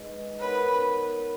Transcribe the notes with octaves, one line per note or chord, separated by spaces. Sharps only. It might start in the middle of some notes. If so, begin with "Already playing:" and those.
Already playing: G#3 D#4 G#4 B4 D#5
B3 D#4 A#4 B4 C#5 F#5